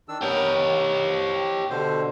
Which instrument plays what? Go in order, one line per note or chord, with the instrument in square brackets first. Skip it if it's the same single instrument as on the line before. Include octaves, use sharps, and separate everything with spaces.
[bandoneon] D#3 D4 E6
[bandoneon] B3 A#4 G5 [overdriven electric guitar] G4 C#5
[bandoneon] D#3
F3
B2 D3 C5